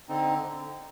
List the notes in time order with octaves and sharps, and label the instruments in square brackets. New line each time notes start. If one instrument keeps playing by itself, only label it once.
[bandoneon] D3 C4 D#4